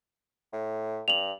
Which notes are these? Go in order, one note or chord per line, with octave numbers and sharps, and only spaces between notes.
A2
G2 F7 F#7